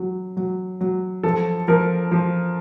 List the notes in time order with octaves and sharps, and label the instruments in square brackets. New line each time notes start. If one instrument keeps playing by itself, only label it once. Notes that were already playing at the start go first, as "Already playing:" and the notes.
Already playing: [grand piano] F#3
F#3
F#3
F3 A4
F3 A#4
F3